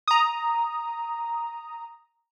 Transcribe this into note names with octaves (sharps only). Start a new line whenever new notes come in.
A#5 D#6